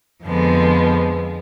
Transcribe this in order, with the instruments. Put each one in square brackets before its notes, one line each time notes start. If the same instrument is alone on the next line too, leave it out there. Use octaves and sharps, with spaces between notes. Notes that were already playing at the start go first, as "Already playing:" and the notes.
[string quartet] F2 D3 F3 G#3 B3